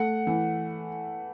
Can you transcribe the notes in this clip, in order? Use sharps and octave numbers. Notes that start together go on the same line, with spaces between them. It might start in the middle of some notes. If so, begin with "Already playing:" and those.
Already playing: A3 F#5
E3